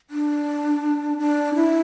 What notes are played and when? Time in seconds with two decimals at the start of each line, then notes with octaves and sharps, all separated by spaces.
0.10 D4
1.18 D4
1.55 E4